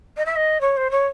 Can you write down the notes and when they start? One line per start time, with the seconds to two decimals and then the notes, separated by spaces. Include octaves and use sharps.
0.17 D#5
0.25 E5
0.36 D#5
0.61 C#5
0.77 C5
0.91 C#5